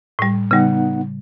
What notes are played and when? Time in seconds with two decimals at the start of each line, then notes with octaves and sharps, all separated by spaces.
0.19 A2 G3
0.51 C#3 G3 B3 D#4 F#5